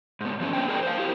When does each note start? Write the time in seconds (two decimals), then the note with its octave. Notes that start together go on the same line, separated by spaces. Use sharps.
0.21 G#2 B3
0.40 F3 G3 A3 C#4
0.53 A3 A#3 D4 C5 C#5 G5
0.68 G#4 A#4 C5 D5 G5
0.83 C5 F5
0.98 E4 G4 A4 A#4